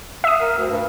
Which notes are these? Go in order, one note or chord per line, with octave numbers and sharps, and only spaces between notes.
E5 D#6
A#4
D2
G2